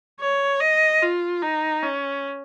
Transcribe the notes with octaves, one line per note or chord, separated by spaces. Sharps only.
C#5
D#5
F4
D#4
C#4